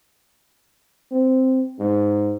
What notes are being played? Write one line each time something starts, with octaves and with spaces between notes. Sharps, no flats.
C4
G#2